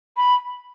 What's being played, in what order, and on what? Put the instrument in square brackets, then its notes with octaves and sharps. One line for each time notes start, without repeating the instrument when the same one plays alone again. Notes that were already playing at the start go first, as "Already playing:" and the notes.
[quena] B5